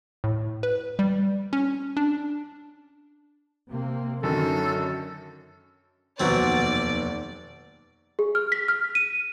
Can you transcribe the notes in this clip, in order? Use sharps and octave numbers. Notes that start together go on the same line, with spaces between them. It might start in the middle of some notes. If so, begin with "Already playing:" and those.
A2
B4
G3
C#4
D4
C3 A#3 C4
F#2 D3 D#3 F#3 C#4 A4
F1 D#2 B2 F#3 C4 D5 F#5
G#4
F6
B6
F6
D#7